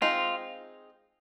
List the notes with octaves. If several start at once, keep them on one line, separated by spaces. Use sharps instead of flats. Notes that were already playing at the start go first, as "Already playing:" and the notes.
G#3 C4 D#4 F4